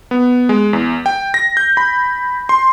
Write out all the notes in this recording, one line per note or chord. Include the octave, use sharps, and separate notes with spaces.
B3
G#3
E2
G5
A#6
G6
B5
C6